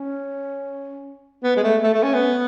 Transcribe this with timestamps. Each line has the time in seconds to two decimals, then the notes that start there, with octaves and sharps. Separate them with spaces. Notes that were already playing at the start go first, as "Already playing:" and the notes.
Already playing: C#4
1.43 B3
1.56 G#3
1.63 A3
1.83 A3
1.94 A3
2.03 C#4
2.14 B3